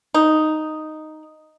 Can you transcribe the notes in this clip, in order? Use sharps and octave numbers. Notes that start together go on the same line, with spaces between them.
D#4